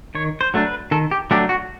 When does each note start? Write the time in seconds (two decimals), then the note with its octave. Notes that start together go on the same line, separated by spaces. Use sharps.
0.15 D#3 C#5
0.41 C5
0.54 F#3 A3 D4
0.67 B4
0.91 D#3 A4
1.11 G4
1.31 F#3 A3 D4 G4
1.49 F#4